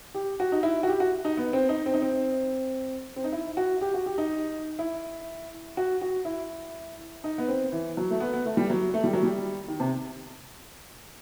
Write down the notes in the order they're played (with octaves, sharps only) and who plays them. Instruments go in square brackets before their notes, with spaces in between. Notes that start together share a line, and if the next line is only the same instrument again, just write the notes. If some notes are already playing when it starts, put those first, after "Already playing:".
[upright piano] G4
F#4
D#4
E4
F#4
G4
F#4
D#4
B3
C4
D#4
C4
D#4
C4
C4
D#4
E4
F#4
G4
F#4
G4
D#4
E4
F#4
F#4
E4
D#4
B3
C4
E3
F#3
A3
B3
B3
A3
G3
F#3
A3
G3
F#3
G3
D#3
C3